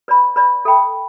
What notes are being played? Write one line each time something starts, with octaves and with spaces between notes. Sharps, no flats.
B4 D5 B5
B4 D5 B5
A4 E5 G5 B5